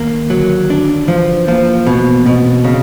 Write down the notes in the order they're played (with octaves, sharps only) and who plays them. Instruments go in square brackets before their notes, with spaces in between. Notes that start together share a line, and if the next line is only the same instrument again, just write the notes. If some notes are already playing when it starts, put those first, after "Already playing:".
Already playing: [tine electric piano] D#3 [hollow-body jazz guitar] A#3
[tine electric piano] D3 [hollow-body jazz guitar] F#3
[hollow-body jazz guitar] D4
[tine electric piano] E3 [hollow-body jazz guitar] F3
[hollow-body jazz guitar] F3 [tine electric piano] A#3
[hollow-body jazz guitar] B2 [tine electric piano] B3
[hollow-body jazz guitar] B2 [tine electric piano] C4
[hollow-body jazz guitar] C#3 [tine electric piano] C#4